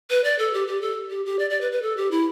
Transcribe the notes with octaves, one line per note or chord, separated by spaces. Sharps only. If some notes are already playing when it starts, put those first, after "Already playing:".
B4
D5
A4
G4
G4
A4
G4
G4
D5
D5
B4
B4
A4
G4
E4